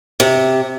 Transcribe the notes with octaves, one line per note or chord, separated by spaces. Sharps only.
C3